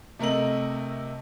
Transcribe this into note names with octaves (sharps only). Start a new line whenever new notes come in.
C3 A3 A#4 D#5 F#7